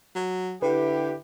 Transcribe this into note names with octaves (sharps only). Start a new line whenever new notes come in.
F#3
D3 E4 G4 B4